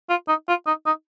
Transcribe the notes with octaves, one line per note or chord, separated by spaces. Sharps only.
F4
D#4
F4
D#4
D#4